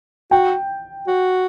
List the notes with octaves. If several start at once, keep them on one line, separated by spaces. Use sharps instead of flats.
F#4 G5
F#4